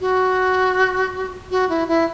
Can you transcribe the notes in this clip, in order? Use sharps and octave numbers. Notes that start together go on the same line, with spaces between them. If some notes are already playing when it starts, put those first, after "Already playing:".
F#4
F#4
E4
E4